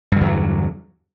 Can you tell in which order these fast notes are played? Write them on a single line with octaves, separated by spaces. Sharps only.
G2 D3 E2 F#3